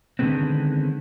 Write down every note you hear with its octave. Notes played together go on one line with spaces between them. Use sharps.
D3 D#3 G3 G#3 B3 C4